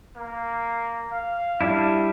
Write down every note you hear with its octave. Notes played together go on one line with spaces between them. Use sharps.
A#3
F5
G3 D4 E4